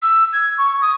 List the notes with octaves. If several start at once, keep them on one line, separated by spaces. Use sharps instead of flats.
E6
G#6
C#6
D#6